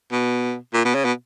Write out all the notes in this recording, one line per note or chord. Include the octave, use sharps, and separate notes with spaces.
B2
A#2
B2
C#3
B2